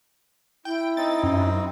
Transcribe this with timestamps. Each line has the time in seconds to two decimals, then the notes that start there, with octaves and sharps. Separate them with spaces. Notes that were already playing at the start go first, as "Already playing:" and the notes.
0.65 E4 G5
0.97 C4 D#4 A6
1.23 F#2